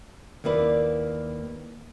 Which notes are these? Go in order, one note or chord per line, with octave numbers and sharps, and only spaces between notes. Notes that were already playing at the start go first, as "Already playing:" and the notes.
D#2 A#3 E4 B4 D5